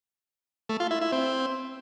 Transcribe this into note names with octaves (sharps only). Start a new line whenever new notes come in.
A3
F4
E4
E4
C4